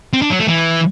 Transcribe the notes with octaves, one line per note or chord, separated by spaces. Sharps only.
C4
D4
F#3
A3
E3